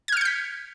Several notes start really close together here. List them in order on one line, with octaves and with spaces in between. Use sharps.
G#6 F6 C#7 G6 B6